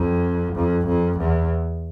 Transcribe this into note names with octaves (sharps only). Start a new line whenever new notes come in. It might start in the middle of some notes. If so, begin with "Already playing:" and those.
Already playing: F2
F2
F2
E2